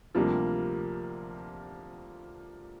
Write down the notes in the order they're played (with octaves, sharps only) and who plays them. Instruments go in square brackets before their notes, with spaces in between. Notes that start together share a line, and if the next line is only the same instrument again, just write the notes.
[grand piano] D2 C3 G3 A#3 D4 [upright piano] F3